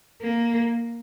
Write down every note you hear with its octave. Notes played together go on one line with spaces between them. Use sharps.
A#3